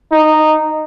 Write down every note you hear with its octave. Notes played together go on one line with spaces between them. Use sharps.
D#4